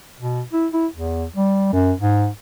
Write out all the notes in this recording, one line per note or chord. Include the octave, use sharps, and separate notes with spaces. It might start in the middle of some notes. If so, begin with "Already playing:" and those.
B2
E4
E4
E2
G3
F#2
G#2